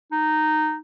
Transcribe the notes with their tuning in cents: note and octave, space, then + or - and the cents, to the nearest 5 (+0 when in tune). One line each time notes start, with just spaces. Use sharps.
D#4 -10